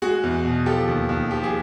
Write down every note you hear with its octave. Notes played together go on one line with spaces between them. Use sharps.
G#3 F#4 G#4
E2
B2
F3 G4 A4
D#2
D#2
F3 G4
G#4